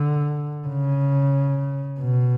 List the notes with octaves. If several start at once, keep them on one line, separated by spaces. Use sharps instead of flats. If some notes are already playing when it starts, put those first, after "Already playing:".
Already playing: D3
C#3
B2